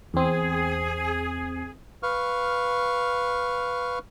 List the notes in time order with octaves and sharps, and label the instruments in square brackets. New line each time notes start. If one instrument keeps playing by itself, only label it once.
[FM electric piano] E2 C4 [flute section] G#4
[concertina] B4 F5 C#6 F6